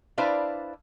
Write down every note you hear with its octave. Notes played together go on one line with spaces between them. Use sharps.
D4 E4 B4 C5 D5 F5